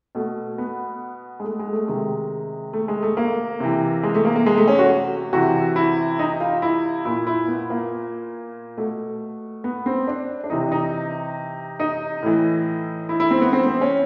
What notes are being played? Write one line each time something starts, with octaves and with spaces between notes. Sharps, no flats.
B2 A3
B3
G#3
A3
G#3
A3
C3 D#3 G#3
A3
G#3
A3
A#3
C3 E3
G#3
A3
A#3
A#3
G#3
A3
C#4
F#4
C3 E3 F#4
E4
D#4
F4
E4
A#2 E4
E4
B3
A#3
B2 A3
B3
C4
D4
D4
C3 E3 D#4
D#4
D#4
A2 E3
E4
E4
C4
B3
C4
C4
C#4